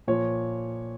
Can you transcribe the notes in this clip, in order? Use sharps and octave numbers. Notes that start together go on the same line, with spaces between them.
A#2 F3 C#5